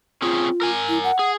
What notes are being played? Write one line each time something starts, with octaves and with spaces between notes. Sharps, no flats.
C4 C#4 F4 G#4
A#4 G#5
E4
F#5
G#4